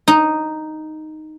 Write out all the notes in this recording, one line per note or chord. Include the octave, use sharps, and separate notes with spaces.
D#4